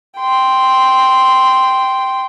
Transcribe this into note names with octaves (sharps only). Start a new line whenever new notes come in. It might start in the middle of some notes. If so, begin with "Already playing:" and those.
G5 C6